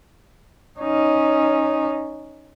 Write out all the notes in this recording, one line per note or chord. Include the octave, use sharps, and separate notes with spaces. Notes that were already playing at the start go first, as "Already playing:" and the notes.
C#4 D#4